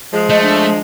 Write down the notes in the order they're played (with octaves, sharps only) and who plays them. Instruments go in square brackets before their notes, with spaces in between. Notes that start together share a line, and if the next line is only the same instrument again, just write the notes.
[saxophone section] F3 G#3
[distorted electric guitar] A3 [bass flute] D#5
[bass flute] D4